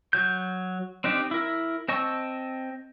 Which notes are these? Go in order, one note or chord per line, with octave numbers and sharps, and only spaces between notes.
F#3 G6
C4 D4 D#4 G4 D5
E4 A#4
C4 D#5 A5 C#6 E6